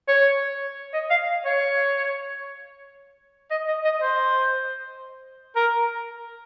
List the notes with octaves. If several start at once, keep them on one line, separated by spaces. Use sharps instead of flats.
C#5
D#5
F5
C#5
D#5
D#5
D#5
C5
A#4